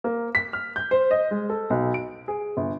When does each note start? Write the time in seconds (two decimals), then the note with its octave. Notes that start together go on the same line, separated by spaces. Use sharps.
0.04 A#3
0.35 B6
0.53 F6
0.76 G6
0.91 C5
1.11 D#5
1.31 G#3
1.50 A4
1.70 B1
1.94 D7
2.28 G#4
2.57 G1